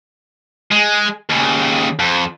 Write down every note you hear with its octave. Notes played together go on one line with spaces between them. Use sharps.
G#3
D#2 C#3
F2